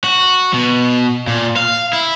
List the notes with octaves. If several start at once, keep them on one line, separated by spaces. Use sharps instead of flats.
F#4
B2
A#2
F5
E4